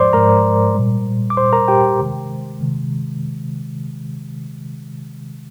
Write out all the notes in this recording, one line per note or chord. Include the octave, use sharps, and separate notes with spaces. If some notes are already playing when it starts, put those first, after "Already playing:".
Already playing: G#2 F3 G#3 C5 D5 C6 D6
G#2 F3 G#3 A#4 A#5
A#2 G3
D6
A#2 G3 C5 C6
A#4 A#5
G4 G5
C3 D#3 G#3
C3 D#3 G#3